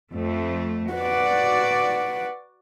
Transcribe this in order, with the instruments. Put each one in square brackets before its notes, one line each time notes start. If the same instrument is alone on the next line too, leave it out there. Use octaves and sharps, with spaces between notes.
[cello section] F2 A3
[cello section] F#4 D5 [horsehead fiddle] B4 F#5